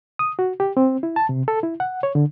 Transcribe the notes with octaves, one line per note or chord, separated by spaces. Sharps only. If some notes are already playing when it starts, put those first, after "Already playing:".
D#6
F#4
G4
C4
E4
A5
C3
A4
E4
F#5
C#5
D3